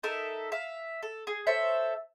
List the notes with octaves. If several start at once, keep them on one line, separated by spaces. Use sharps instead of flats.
D#4 A4 A#4 E5
E5 F5
A4
G#4
A4 C5 C#5 E5